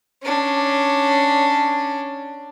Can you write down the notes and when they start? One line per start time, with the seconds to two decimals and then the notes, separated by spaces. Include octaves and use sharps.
0.23 C#4 D4